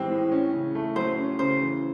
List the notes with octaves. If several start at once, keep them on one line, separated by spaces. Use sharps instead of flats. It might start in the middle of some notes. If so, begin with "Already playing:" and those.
Already playing: A2 E3 G#3 C4 G4
A2
C#4
C#3
A3
F#3 C5
C#4
C#3 C5
E3